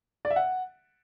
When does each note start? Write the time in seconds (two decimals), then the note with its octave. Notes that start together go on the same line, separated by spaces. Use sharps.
0.25 D5
0.30 E5
0.36 F#5